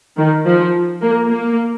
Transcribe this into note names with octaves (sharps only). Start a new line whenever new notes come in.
D#3
F3
A#3
A#3